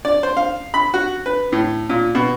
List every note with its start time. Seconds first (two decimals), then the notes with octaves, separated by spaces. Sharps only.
0.05 D5
0.23 C5
0.37 F5
0.74 B5
0.94 F#4
1.26 B4
1.52 A2
1.89 A#2
2.15 B2